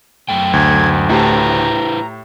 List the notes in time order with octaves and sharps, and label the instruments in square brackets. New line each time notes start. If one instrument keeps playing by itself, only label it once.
[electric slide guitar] F#2 A3 G5
[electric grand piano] D2 [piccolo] G#6
[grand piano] A2 G4 A5 [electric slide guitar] E4 B4 C5 [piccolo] A#5